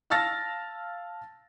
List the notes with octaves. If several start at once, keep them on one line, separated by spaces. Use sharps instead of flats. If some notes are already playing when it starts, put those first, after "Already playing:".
F5 A5 E6 F6 A6 A#6